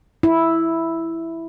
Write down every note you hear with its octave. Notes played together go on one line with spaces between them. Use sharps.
E4